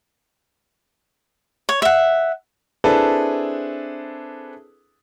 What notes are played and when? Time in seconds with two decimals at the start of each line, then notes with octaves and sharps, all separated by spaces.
1.69 C#5
1.82 E5 F#5
2.84 C4 D4 E4 G#4 A4 B4